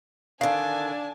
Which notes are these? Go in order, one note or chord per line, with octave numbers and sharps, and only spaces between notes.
D3 D#3 D4 F5 G#5 A5